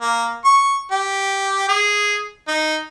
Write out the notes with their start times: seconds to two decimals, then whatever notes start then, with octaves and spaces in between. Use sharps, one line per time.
0.01 A#3
0.45 C#6
0.91 G4
1.69 G#4
2.48 D#4